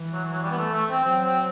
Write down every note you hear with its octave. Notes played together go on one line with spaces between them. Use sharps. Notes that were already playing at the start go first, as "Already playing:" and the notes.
Already playing: E3
F#3
F#3
G3
B3
A3
A3
C4
F#3 C4
C4